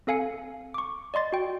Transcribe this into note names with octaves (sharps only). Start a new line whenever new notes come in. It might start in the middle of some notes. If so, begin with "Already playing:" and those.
C4 A4 F5 G#5 C#7
C#6 D6
D5 D#5 C6 A6
F#4 G5